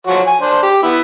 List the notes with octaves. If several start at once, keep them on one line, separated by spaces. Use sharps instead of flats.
F3 F#4 C#5
G#5
D4 C5
G4
B3 E4